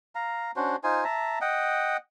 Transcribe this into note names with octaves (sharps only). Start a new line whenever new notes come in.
F5 A#5
C#4 D4 F#4 C5
D#4 F4 C5 G#5
E5 A5 A#5
D#5 F#5 G5